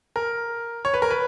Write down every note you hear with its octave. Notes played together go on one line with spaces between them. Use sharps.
A#4
C#5
B4
A#4
B4